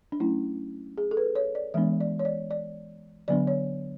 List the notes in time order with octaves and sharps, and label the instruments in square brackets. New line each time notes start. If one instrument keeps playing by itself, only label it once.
[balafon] D4
F#3 A3 C#4 E4
G#4
A4
B4
C#5
D5
E3 G#3 B3 D4 E5
D5
C#5
D5
D5
D3 F#3 B3 D4 D5
C#5